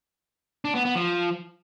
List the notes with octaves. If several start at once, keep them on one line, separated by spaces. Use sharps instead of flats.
D4
B3
B3
F3